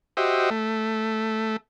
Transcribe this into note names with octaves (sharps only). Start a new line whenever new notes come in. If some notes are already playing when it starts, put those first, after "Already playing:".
F#4 G4 C5 D#5 E5
A3